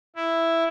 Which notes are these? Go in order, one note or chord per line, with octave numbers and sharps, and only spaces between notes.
E4